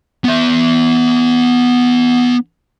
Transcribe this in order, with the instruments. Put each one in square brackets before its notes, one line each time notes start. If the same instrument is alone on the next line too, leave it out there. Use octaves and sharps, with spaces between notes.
[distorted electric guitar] B3 E5